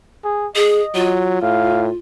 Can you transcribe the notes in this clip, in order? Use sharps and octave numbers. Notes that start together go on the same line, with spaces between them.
G#4
G#4 D#5
F#3 F4
A2 F5